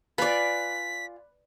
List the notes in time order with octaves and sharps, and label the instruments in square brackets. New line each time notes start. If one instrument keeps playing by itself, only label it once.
[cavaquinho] F4 G#5 [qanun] B4 D5 [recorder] B6